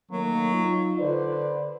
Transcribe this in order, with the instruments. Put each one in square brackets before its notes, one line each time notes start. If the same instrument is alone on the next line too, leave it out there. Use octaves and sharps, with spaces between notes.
[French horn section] D#3 A3 A#3 [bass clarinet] F#3
[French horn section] D#4 F4
[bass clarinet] D3 [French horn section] B4 C5 D5